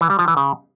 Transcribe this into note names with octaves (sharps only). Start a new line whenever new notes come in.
E3
G3
F3
E3
C#3